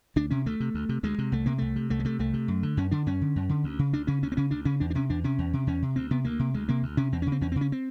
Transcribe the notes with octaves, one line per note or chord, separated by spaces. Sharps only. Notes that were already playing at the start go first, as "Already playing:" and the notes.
D2 D4
C3 C#4
D2 A3
C3
D2
C3
D2 G#3
C3
C2 A3
C3 A#3
C2 A3
C3
C2 A3
G#3
C3 A3
C2 A3
C3
F#2
D3
F#2 C#4
D3 D4
F#2 C#4
D3
F#2
D3
D2
C#3
D2 D4
C#3 C#4
D2 C#4
C4
C#3 C#4
D2 D4
C#3 C#4
E2 D4
D4
C3 C#4
E2 D4
C3 C#4
E2
C3
E2 C#4
C3
D2 C4
C3 B3
D2 A#3
C3
D2 G#3
C3 A#3
D2
C3 C#4
E2 C4
C#3 C#4
C4
E2 C#4
C#3 C4
C#4
C4